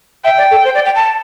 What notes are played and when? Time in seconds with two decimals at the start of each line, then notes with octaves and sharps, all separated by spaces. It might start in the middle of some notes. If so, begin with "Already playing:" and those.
0.24 E5 G5
0.38 D5
0.51 A4
0.65 C5
0.75 D5
0.85 G5
0.95 A5